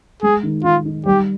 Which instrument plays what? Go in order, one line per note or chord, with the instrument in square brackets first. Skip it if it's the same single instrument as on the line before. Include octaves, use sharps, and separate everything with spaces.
[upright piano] G#3 [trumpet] G#4
[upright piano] D#3
[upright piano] D#3 [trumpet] F4
[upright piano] D#4
[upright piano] G3 [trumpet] G4